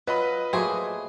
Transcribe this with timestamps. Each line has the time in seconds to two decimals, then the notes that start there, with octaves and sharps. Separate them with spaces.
0.07 F#3 F4 B4 D#5 B5
0.53 F#3 A3 A#3 G#4 C5